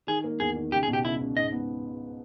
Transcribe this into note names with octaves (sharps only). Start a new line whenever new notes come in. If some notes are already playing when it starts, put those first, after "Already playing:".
D#3 G#4
A#3
E2 G#4
D#3
C#2 G4
G#4
B2
G4
C#2 E4
C#2
G#2 D#5
B3